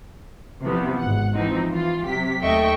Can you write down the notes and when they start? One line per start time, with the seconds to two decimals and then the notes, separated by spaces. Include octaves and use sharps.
0.63 C3 E3 F3 G3 B3 C4
0.99 G#1 F#5
1.35 E3 F3 C4 D#4
1.70 E3 F4
2.07 C3 F#3 G4 B6
2.43 D#2 A3 D#5 E5 G5 C#6